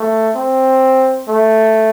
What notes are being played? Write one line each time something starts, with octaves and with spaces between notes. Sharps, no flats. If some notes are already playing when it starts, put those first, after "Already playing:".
Already playing: A3
C4
A3